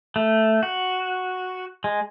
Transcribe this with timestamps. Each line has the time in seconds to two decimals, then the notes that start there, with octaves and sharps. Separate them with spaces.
0.16 A3
0.63 F#4
1.84 G#3